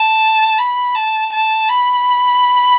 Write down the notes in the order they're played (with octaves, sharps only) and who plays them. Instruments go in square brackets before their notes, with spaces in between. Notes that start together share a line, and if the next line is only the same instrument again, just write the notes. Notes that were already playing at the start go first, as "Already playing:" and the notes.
Already playing: [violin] A5
B5
A5
A5
B5